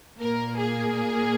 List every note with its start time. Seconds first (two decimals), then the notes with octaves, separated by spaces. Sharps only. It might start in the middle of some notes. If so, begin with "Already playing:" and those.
0.19 A#2 A#3 A#4
0.58 G#4